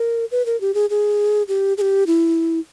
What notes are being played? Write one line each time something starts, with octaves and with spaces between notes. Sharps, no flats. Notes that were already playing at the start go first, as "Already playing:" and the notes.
Already playing: A#4
B4
A#4
G4
G#4
G#4
G4
G#4
G4
E4